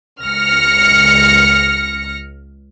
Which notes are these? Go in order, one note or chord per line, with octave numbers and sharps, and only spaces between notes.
C#2 F6 A#6 C#7